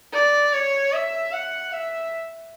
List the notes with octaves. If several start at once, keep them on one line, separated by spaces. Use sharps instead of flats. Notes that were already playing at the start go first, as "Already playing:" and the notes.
D5
C#5
E5
F#5
E5